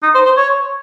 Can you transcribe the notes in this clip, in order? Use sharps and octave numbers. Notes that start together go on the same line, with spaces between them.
D#4
C5
C5
C#5